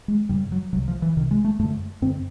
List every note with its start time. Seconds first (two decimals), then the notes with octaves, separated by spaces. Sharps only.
0.08 G#3
0.29 F#2 C#3 G3
0.52 F#3
0.73 C3 F#3
0.76 C2
0.88 F3
1.02 E3
1.16 C2 C3 D#3
1.31 G#3
1.44 A3
1.59 F#2 D3 A3
2.02 F#2 D3 C4